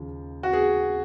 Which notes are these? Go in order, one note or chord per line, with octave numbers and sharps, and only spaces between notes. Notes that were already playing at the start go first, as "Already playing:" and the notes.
Already playing: D#2 C#3 F3
F#4
G#4